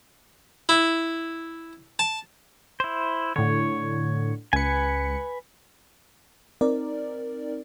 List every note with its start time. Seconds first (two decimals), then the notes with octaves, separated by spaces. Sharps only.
0.69 E4
1.99 A5
2.80 E4 C5
3.36 A2 D3 C#5
4.53 C#2 B4 G#5 C#7
6.61 C4 D#4 A#4 D5